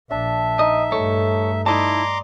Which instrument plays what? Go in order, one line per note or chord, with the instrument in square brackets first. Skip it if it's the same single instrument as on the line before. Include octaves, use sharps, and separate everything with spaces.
[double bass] A#1 [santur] D4 [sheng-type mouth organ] E5
[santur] D#4 [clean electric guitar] D#5
[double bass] G2 A3 [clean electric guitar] A4 C#5
[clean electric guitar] D#4 E4 A5 [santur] D5 D#5 [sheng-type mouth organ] A#5 C6 D6